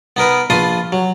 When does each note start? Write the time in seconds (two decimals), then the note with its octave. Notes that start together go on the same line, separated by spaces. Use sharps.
0.17 B3 D#4 A#4 B4
0.50 A#1 F4 B4 A5 C6 D#6
0.92 F#3